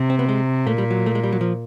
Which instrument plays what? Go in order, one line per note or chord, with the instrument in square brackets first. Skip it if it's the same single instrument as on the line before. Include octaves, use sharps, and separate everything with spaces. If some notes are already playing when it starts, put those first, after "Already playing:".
Already playing: [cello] C3
[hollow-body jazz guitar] C4
B3
G#3
[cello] A#2 [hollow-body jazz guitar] A3
[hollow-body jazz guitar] G3
F#3
A3
G#3
G3
F#3
F3